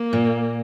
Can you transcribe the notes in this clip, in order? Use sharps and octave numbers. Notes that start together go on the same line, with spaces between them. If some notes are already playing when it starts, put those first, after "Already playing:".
Already playing: A#3
A#2